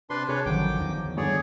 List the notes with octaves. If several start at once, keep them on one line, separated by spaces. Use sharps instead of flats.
C3 D4 G4 B4 C6
C3 D4 G#4 B4 C#5
A1 F#2 D3 D#3 F3 G5 D6
E2 D#4
G2 D3 B3 G#4 C#5 D5